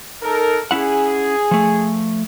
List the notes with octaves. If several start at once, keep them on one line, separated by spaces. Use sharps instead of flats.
D#4 A4 A#4
C#4 E4 G#4 F#5
F3 A3